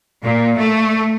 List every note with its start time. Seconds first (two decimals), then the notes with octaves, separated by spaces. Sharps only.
0.23 A#2
0.57 A3